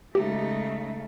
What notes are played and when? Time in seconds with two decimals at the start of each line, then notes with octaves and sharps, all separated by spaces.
0.15 C#3 G#3 A3 D#4 G4